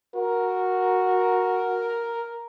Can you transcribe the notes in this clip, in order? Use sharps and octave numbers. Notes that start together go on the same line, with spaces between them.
F#4 A#4